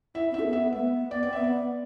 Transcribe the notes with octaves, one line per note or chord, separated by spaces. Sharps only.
E4 E5
C4
E5
A4
B3
E5
A3 E5
B3
B3 D5
C4 D5
B3 E5
D5